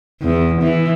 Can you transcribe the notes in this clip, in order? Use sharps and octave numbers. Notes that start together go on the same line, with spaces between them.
E2
E3